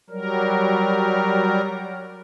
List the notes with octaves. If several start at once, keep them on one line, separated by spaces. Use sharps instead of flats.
F#3 G3 A#4